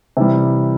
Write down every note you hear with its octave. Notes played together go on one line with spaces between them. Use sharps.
C3 E3 G3